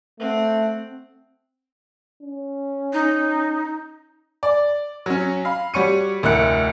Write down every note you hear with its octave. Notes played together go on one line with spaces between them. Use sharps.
A3 C4 F#5
C#4
D#4
D5
F#3 C#4
F5 B5
G3 F#4 C#5 C#6 C#7 D#7
F1 D2 A#3 E4 F#6 C#7